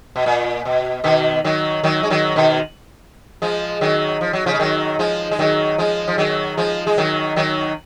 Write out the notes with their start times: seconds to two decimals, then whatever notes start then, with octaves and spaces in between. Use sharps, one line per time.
0.16 B2
0.26 A#2
0.65 B2
1.04 B2 D#3
1.44 D#3 F#3
1.84 D#3 F#3
2.03 G#3
2.10 D#3 F#3
2.36 B2 D#3
3.42 F3 G#3
3.81 D#3 F#3
4.21 F3
4.33 F#3
4.46 C#3 F3
4.54 G#3
4.60 D#3 F#3
4.99 F3 G#3
5.31 G#3
5.39 D#3 F#3
5.78 F3 G#3
6.08 F3
6.18 D#3 F#3
6.57 F3 G#3
6.87 G#3
6.98 D#3 F#3
7.36 D#3 F#3